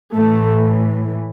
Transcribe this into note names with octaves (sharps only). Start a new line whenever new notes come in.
A2 E3 A3